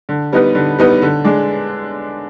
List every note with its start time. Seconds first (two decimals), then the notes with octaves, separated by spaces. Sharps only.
0.09 D3
0.33 G3 B3 D#4 B4
0.55 D3
0.79 G3 B3 D#4 B4
1.02 D3
1.25 G#3 D4